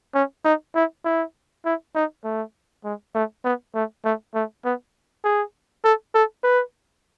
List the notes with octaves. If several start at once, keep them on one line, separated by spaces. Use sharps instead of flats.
C#4
D#4
E4
E4
E4
D#4
A3
G#3
A3
B3
A3
A3
A3
B3
G#4
A4
A4
B4